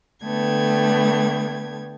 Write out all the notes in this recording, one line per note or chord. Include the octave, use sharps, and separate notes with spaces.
D3 A3 B3 G5 G#6